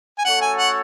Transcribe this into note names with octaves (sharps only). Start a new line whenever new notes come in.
G#5
A3 C#4 F#4 A4 C#5 F#5
G#5
F#5